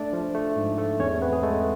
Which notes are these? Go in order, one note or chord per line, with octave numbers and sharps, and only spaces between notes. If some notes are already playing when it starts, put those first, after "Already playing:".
Already playing: A3 D4 D5
F3
A3
G#2
A3
E2 C#4 C#5
B3 C4 B4
G#4
G#3 A3 A4